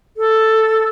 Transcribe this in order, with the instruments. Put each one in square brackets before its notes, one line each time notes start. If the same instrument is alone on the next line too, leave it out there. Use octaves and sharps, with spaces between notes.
[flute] A4